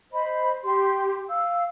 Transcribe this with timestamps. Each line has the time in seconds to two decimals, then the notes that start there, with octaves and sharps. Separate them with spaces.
0.12 C5 D#5 B5
0.64 G4 C6
1.29 F5 E6